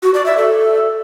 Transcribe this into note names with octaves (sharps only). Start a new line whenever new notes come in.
F#4
D5
E5
A4